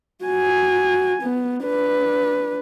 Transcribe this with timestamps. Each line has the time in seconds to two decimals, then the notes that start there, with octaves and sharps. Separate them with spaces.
0.24 F#4 G#5
1.22 B3
1.64 D4 B4